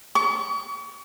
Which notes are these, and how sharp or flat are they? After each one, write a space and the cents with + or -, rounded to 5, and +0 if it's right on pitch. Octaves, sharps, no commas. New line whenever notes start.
C#6 +40